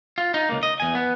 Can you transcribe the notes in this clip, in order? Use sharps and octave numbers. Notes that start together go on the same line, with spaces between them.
F4
D#4
C#2 A#3
D#5
E2 G#5
B3